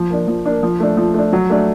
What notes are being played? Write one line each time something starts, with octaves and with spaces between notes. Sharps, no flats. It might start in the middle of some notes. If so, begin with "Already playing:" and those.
Already playing: F3
A#3 D4
F3
A#3 D4
F3
A3 D4
F3
A3 D4
F#3
A3 D4